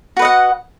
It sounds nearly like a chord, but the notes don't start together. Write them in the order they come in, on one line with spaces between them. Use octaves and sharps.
F#4 B4 D#5 F#5